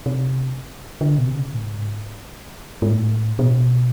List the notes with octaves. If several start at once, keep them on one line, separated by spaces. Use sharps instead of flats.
C3
D3
B2
C3
C#3
A2
G#2
G#2
A2
B2